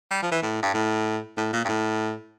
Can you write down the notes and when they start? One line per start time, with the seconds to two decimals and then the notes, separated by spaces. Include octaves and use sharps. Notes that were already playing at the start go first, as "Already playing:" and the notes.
0.11 G3
0.22 F3
0.32 E3
0.42 A2
0.62 G2
0.74 A2
1.37 A2
1.53 A#2
1.65 G2
1.69 A2